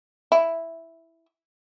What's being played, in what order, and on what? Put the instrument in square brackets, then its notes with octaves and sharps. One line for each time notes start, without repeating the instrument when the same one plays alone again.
[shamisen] E4